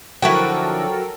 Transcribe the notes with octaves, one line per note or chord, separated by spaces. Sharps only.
D3 F3 F#3 E4 F#4 A4 A#4 G5